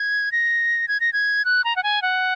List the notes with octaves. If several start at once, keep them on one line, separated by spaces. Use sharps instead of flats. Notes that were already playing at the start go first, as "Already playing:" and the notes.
Already playing: G#6
A#6
G#6
A#6
G#6
F#6
A#5
F#5
G#5
F#5